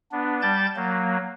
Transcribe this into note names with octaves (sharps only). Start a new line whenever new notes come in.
B3 D4
G3 D5 A5 G6 A6
F#3 A#3